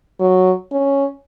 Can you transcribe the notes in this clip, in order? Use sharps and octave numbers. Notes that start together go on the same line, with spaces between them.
F#3
C#4